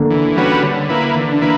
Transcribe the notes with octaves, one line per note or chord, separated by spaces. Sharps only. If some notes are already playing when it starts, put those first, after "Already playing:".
Already playing: D3 A#3
E3
G3 C#4 F#4 B4
D3
A#3 E4 B4
D3 E3
D4
A#3 E4 B4